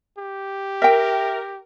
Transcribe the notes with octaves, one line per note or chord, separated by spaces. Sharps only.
G4
A#4 E5 G5